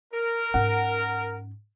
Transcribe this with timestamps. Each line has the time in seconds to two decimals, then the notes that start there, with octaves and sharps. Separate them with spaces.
0.13 A#4
0.54 G#2 C#4 F#5